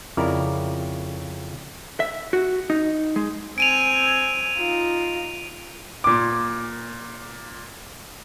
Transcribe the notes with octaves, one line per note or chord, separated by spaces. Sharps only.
F2 C#3 E4 A#4 D5
E5
F#4
D#4
G#3
C4 G#5 D7 D#7 F7
D#4 F4
A#2 D6